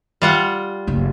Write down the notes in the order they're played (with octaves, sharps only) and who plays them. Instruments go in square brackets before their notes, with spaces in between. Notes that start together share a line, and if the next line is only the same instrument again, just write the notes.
[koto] G3 F4 F#5
[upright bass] F#1 F#2